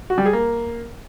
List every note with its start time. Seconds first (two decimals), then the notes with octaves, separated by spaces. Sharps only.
0.10 F#4
0.18 G3
0.25 G#4
0.33 A#3